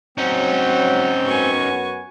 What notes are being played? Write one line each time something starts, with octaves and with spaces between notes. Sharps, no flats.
F#3 C4 C#4 D#4 F#5 G6
F#2 B3 F#4 G#5 C#6